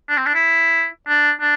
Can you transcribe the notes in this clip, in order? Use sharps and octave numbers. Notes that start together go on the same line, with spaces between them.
D4
C4
D4
E4
D4
D4